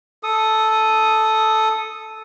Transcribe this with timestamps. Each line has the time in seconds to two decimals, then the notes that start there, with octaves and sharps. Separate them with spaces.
0.23 A4 D#6